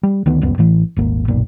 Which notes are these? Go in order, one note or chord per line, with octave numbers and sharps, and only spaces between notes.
G3
D2 D#3 B3
D#1 C#2 F#2 B3
A1 A2 E3
D#1 G#1 A#3
F#1 B1 A#2